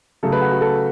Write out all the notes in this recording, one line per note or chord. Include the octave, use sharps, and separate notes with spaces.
C#3 F#3 A3 A4
B4
F#4
F#4
A4